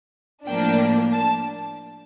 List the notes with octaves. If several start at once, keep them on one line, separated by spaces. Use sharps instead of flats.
A2 F3 A#3 D4 G5
A5